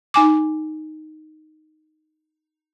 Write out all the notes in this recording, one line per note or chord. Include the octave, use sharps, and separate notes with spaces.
D#4 G#5 D6